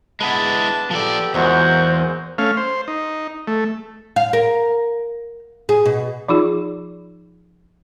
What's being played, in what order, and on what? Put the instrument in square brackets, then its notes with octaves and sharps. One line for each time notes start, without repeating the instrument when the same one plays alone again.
[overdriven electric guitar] G#3 E4 [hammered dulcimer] B3 B4 [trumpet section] D4 A5
[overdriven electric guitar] F3 D5 [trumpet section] G4 A4
[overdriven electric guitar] E2 [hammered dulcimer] A#2 F#3 G#3 [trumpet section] A#4 F#5 [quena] C5
[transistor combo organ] A3 C#4 F5
C5
D#4
A3
[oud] F5
A#4
G#4
B2
[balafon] F3 D#4 F4 G#4